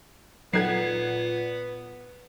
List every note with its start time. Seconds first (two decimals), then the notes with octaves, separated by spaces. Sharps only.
0.53 A#2 F#3 B3 D#4 A4 F#5 G#6 C7